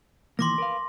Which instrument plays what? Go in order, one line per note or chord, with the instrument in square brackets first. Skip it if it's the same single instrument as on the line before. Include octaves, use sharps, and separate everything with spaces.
[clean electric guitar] D#3 E3 A#3 [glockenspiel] C6 D6 A#6
[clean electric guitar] A#4 B4 F5